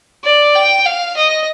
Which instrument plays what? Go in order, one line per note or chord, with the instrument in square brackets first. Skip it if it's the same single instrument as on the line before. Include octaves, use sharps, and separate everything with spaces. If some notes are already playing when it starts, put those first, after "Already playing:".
[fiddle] D5
G5
F5
D#5